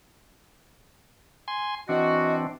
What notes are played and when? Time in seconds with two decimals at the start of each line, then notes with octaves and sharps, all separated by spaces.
1.48 G#5 C6
1.89 E3 C4 D4 F#4 D#5